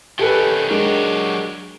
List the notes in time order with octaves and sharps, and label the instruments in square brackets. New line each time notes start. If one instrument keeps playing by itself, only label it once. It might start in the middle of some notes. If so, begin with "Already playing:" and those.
[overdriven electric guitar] D#3 C#4 [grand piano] G4 A4 B4
[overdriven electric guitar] F#3 G4 [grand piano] G#3 D4 A#4